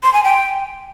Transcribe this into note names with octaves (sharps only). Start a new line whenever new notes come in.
C6
G#5
G5